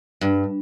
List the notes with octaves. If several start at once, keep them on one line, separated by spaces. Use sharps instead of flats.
G2